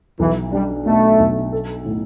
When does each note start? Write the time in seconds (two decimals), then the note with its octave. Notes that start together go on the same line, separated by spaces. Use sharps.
0.19 B1 E3
0.52 G3 D4
0.86 B2 A3
1.19 B1
1.52 A4
1.85 A2